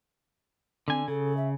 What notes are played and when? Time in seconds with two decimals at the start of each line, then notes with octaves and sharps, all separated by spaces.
0.88 D3 C4 G#5
1.08 C#3 A4
1.37 E5